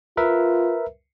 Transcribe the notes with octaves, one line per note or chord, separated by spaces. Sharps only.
F4 A#4 B4 E5